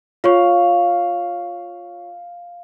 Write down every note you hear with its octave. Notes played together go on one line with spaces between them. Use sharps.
F4 C#5 F5 C#6